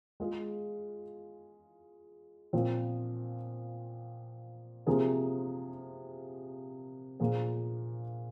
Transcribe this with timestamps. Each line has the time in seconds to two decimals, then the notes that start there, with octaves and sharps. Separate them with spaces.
0.20 G#3 F4 G#4
2.53 A#2 F3 C4
4.86 C3 F3 A#3 G#4
7.20 A#2 F3 A#3 G#4